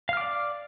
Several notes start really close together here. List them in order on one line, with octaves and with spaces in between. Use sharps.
F5 F6 D6 D5